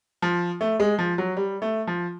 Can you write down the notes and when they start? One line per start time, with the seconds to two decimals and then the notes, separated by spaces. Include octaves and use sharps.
0.22 F3
0.61 A3
0.80 G#3
0.99 F3
1.18 F#3
1.37 G3
1.62 A3
1.87 F3